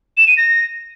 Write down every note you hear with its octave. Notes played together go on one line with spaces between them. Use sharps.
E7
D#7
A#6